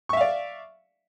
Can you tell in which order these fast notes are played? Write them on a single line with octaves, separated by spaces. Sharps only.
C#6 E5 F5 D5